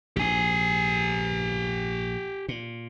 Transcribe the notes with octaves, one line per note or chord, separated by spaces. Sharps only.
A#1 G#2 G4 G#5
A#2